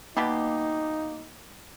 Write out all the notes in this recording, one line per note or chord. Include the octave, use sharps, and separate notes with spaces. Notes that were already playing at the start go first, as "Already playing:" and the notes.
B2 G3 A#3 D#4 G4